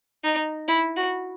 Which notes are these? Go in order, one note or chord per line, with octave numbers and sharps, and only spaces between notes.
D#4
E4
F#4